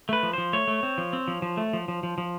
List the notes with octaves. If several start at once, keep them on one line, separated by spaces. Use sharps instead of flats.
A3 B4
F3
F3 C5
A3 C#5
A3
C4
F3
C4
F3
F3
A3
F3
F3
F3
F3